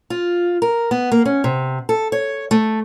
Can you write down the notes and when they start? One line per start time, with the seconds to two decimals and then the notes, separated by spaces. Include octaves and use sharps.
0.10 F4
0.62 A#4
0.91 B3
1.12 A#3
1.25 C#4
1.44 C3
1.89 A4
2.12 C#5
2.51 A3